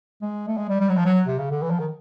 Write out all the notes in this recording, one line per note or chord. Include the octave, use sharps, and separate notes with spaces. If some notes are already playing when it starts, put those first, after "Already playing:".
G#3
A3
G#3
G3
G3
F#3
F3
F#3
C3
C#3
D3
E3
F3
D#3